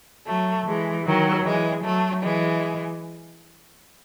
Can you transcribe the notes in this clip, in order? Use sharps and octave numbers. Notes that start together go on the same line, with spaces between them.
F#3 A3
E3 G#3
D#3 F#3
E3 G#3
F#3 A3
E3 G#3